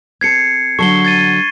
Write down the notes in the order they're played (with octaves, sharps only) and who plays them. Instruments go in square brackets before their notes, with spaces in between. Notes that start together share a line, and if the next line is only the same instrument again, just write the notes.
[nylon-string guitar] C4 A4 [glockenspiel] G#6 C7 C#7
[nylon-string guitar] D3 F#3 A4 [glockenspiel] C#6 C7 G7
[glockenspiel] G#6 A6 D#7